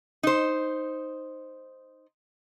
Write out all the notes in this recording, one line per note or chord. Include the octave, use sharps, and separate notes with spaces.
D#4 C5